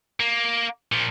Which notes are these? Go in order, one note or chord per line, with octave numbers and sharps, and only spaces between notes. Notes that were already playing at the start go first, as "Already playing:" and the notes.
A#3
A#2 F3